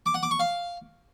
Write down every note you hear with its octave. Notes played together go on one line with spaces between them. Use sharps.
D6
F#5
D6
C#6
F5